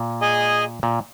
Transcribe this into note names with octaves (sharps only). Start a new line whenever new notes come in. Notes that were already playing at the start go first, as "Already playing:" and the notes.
Already playing: A#2
G#4 D#5 G#5
A#2